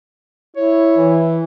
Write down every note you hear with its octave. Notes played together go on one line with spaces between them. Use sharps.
E4 C#5
E3